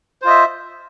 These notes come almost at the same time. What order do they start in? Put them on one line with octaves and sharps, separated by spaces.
C5 F4 D#5 E5